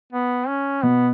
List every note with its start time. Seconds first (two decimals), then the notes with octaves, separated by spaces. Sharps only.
0.13 B3
0.48 C#4
0.83 B2 B3